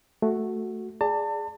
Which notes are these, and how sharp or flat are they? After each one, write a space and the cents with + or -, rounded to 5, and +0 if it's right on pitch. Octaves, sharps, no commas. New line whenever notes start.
A3 +0 F#4 +0
G#4 +0 D5 +0 A5 +35